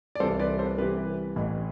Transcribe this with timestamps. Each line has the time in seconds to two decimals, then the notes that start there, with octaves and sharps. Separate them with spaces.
0.15 D5
0.20 C2 C3 E3 A4 C5
0.40 B4 D5
0.59 A4 C5
0.78 C2 C3 E3 G4 B4
1.36 A1 A2 E3